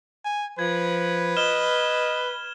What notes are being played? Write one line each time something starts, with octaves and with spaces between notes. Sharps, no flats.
G#5
F3 B4 G#6
D#5 F6 E7 G7